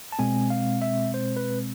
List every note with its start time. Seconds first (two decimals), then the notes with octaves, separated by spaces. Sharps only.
0.12 A5
0.19 B2 G#3 C4 G#5
0.50 F5
0.82 E5
1.14 C5
1.37 B4